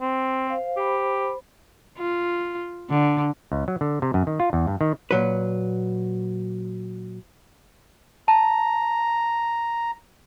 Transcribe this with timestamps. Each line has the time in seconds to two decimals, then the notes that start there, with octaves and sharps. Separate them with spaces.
0.01 C4
0.47 C5 F5
0.77 G4 C5 B5
1.98 F4
2.90 D3
3.52 C#2
3.68 F#3
3.81 D3
4.02 C3
4.14 F#2
4.27 D#3
4.40 F4
4.53 E2
4.67 G2
4.81 D#3
5.11 A#2 F#3 B4
8.28 A5 A#5